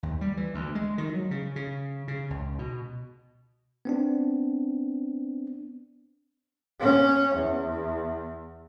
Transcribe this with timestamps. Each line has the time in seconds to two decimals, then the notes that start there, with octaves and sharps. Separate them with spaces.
0.03 D#2
0.21 G3
0.37 E3
0.54 D2
0.75 G#3
0.98 D#3
1.14 F#3
1.31 C#3
1.56 C#3
2.08 C#3
2.30 C#2
2.59 B2
3.85 B3 C4 D4
6.80 C#4
7.35 E2